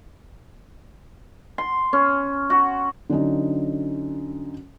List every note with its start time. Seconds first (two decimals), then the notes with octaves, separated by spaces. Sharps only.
1.58 C6
1.93 C#4
2.50 F#4
3.10 D3 F#3 C#4 D#4